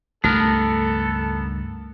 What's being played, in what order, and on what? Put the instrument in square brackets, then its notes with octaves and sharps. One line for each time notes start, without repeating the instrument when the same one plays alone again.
[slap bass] C#2 G2 D#3 [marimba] A3 [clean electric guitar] B3 A#4 [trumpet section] A4